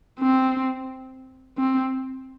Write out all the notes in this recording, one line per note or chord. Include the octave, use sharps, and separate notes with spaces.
C4
C4